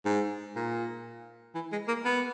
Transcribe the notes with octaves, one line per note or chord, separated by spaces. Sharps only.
G#2
A#2
E3
G#3
A#3
B3